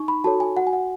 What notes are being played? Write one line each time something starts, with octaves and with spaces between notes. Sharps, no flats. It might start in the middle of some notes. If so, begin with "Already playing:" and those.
Already playing: D#4 C#6
B5
F#4 A4 C#5 A5
G#5
F#4 F#5
G#5
F#5